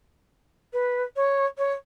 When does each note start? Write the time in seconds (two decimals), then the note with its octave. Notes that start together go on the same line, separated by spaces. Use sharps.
0.73 B4
1.16 C#5
1.57 C#5